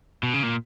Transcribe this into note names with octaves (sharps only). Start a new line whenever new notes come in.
B2
C#3
A#2